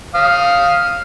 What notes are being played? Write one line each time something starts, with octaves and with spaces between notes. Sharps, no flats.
F5 D#6